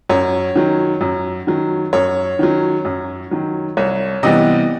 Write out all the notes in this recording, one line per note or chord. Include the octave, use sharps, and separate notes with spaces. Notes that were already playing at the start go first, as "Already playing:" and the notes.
F#2 C#5
D#3 F#3
F#2
D#3 F#3
F#2 C#5
D#3 F#3
F#2
D#3 F#3
C2 C#5
C3 E3 G3 B3 D#5